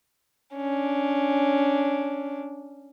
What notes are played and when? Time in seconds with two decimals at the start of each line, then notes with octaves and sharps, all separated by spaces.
0.56 C#4 D4